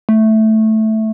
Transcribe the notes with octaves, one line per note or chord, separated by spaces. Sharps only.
A3